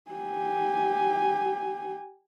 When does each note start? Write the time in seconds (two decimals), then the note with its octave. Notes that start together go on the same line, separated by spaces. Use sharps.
0.11 G4 G#5